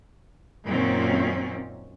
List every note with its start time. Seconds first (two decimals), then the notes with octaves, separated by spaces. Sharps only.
0.67 F#2 A#2 D#3 F#3 C4 C#4